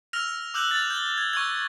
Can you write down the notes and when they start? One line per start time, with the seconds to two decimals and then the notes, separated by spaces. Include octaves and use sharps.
0.13 E6 F6 A#6 F7
0.54 D6 E6 F#6 G6 F#7
0.71 A6 F7
0.90 G6 G7
1.18 G#6
1.33 C#6 E6 G#6